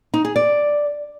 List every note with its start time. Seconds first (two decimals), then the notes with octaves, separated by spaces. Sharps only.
0.14 D#4
0.25 G#4
0.36 D5